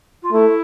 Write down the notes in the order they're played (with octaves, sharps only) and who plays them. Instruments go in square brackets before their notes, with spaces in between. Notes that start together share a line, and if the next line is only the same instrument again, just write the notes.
[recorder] F4
[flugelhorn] A3 [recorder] E4